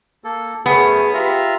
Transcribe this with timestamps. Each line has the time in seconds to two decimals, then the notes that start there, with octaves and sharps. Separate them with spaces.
0.24 A#3 A4
0.66 F#2 A3 B3 C#4 G#4
1.14 F4 G4 E5 A#5